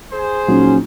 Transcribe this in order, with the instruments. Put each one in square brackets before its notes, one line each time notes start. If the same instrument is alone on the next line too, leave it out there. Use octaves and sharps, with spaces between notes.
[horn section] G#4 C5
[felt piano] A#1 F#3 D#4 [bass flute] C#4